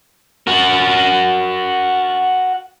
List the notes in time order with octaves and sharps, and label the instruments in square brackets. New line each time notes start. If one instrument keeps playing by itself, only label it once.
[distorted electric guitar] F#4 A#4